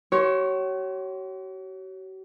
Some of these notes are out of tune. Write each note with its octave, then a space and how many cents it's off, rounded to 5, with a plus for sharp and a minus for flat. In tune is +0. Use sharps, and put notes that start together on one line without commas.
F#4 +45 C#5 +0 C6 +0